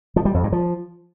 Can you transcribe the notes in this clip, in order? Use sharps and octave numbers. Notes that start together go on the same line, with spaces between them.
F3
G3
F2
G2
F3